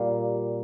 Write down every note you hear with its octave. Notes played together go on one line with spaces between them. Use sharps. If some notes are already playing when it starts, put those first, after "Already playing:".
Already playing: A#2 G3 A#3